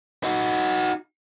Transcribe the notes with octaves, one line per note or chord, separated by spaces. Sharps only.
D#4 F#4